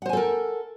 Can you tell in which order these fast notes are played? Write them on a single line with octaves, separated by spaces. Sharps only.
F#5 C5 G#5 A4 A#4